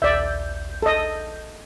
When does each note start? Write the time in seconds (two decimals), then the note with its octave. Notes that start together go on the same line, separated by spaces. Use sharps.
0.02 A#1 D#2 D5 E5 G6
0.82 A4 D#5